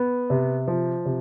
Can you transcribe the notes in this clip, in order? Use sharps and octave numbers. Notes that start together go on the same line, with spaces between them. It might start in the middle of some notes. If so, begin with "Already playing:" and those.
Already playing: B3
C3
F3
C3